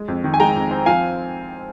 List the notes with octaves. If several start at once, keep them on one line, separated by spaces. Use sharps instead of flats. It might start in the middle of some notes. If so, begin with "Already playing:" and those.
Already playing: G#3
F2
D#3
G#5
G#3 G5 A#5
F2
C4
F3 F5 G#5